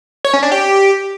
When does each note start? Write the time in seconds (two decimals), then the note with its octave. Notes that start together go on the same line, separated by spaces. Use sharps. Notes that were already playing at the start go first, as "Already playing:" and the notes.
0.24 C#5
0.34 C#4
0.43 D4
0.52 G4